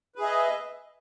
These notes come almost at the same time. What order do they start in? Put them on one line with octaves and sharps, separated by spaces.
B4 G#4 E5 D#5